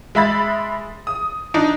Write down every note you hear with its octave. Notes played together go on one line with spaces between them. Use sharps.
G#3 E5 B5 A6
D#6
D4 D#4